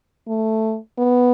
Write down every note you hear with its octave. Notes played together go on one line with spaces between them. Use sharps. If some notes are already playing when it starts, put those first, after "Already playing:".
A3
B3